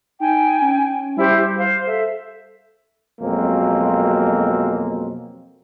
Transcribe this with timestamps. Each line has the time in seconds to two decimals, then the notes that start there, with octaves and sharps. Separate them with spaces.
0.20 D#4 G5 G#5
0.62 C#4
1.17 G3 E4 G4 C5
1.36 G4
1.56 C5 F5
1.86 A4 E5
3.20 F2 B2 F#3 G#3 A#3 C4